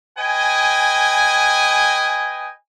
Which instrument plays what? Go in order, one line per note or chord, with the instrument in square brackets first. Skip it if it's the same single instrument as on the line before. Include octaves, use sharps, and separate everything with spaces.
[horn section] B4 D#5 G5 G#5